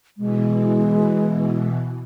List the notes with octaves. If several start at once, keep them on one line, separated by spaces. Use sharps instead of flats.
B2 E3 G#3